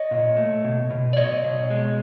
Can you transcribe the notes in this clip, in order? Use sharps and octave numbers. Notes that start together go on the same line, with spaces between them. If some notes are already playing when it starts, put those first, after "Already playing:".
Already playing: C#5 D#5
A#2
A3
B2
B2
D5
B2 C#5 D#5
B2
G#3